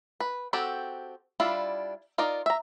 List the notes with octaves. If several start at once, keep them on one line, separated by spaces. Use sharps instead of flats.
B4
C4 F#4 G4 A4
G3 D4 E4 F4
D#4 F4 A#4 D5
E5 A#5